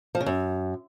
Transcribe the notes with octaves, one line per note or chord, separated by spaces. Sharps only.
F3
C#3
F#2